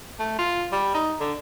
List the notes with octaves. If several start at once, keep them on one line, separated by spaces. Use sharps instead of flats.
A3
F4
G3
D#4
D3